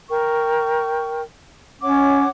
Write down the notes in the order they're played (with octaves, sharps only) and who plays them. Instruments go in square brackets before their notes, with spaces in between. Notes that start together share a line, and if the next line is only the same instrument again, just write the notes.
[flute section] A#4 G5 C#6
[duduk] C#4 [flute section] C#5 F#5 D6